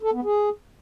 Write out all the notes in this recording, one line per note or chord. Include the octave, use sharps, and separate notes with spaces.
A4
B3
G#4